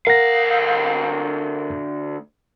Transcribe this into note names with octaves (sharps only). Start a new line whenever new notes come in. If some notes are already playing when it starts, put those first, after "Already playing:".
D2 A#4 F5 F#5 A#6